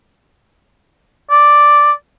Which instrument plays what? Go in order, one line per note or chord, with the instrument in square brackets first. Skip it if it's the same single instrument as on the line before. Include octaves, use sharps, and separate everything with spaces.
[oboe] D5